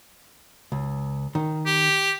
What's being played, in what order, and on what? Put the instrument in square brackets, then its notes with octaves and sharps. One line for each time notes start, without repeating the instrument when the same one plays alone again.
[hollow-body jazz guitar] C#2
D#3
[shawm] G4